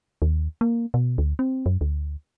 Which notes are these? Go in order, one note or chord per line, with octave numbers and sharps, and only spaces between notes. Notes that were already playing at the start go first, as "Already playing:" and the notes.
D#2
A#3
B2
D2
C4
F#2
D2